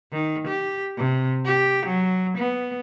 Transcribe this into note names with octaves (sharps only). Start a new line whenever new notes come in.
D#3
G4
C3
G4
F#3
B3